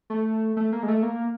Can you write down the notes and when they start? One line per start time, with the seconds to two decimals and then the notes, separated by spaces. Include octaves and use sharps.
0.10 A3
0.57 A3
0.72 A#3
0.83 G#3
0.88 A3
1.03 A#3